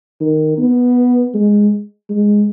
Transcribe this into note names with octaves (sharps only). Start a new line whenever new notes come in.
D#3
B3
G#3
G#3